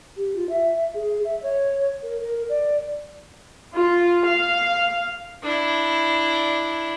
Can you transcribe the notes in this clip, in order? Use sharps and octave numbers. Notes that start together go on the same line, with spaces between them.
G4
F4
E5
G#4
E5
C#5
A#4
A#4
D5
F4
F5
D4 E4